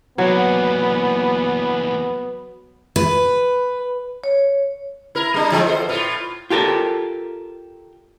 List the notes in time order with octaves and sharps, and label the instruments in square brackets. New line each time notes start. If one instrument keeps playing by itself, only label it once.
[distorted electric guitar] E2 A#3 [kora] F#3 [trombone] B3
[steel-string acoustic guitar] B4
[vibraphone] C#5
[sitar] E4 A#4
G3 D4
A2 E3 G#3
E2 A4 C5
A2 F4
[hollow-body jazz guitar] F4 G4 A4 A#4